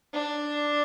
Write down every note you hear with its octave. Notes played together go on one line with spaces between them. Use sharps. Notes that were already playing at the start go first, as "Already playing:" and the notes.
D4